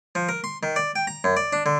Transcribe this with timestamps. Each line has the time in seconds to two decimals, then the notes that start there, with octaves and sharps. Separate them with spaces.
0.15 F3
0.29 A#4
0.44 C6
0.63 D#3
0.76 D5
0.96 G5
1.07 A#5
1.24 F#2
1.37 D5
1.53 D4
1.66 D3